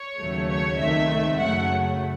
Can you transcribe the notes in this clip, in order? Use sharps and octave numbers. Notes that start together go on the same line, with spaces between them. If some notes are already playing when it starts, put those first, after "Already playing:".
Already playing: C#5
D#2 C#3 F#3 A3
C#5
C#2 C3 D#3 A3 E5
F#2 C#3 F#3 A3 F#5